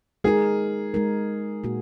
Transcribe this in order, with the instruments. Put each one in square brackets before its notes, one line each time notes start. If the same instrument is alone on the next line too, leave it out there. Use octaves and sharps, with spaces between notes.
[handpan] G#3 D#4 A#4 [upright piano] G#4
[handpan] G#3 D#4 A#4
A#2 A#3 F#4